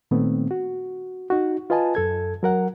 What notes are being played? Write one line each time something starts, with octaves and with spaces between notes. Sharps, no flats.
A#2 D#3 A3 B3 C4
F#4
D#4 F#4
F4 B4 D#5 G#5 A5
F#2 A4 G#6
F#3 A#4 F#5